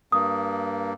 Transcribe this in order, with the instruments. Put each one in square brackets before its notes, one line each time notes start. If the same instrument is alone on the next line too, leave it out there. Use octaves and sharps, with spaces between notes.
[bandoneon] G2 A#3 [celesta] D#6